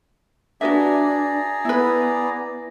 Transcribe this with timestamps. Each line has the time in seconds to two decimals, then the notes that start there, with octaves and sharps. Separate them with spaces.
0.61 D4 F#4 G#4 B4 D5 E5 A#5
1.65 B3 E4 B4